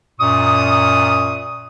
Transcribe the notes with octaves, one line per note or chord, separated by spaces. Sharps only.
F#2 A#2 C#6 D#6